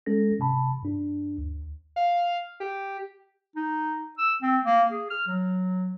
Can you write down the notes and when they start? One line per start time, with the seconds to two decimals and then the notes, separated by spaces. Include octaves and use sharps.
0.06 G#3 C#4 A4 A#6
0.39 G#2 C3 A5 B5
0.83 G2 D4
1.38 D2
1.96 F5
2.60 G4
3.56 D#4
4.18 E6
4.42 C4
4.65 A#3
4.91 G#4
5.10 F6
5.27 F#3